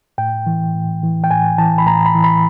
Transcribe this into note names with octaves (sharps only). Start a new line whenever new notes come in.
A2 G5
E3
A2
E3
G5
A2 G#5
E3 A5
B5
A2 A#5
B5
E3
B5